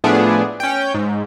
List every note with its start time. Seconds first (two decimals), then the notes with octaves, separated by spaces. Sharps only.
0.04 A2 F3 A3 B3 D4 G#4
0.60 C#4 G5
0.94 G#2